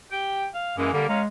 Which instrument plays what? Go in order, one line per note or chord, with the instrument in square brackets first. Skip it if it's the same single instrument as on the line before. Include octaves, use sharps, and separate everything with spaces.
[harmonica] G4 G5
F5
[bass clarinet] F#2 [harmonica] E3 G#3 A#3
[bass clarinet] D3 [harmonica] G3 A#3
[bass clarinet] G#3 [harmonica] C#4 F5 A#5